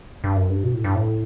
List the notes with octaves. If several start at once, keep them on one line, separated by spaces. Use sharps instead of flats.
G2
F#2
G2
B2
A2
G2
A2